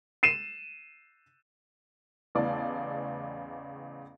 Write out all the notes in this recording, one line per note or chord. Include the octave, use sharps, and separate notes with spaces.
C7 D#7 E7
A1 E2 C#3 D5 A5